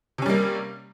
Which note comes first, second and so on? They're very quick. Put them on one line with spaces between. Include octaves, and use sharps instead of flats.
C3 C#4 G3 A#3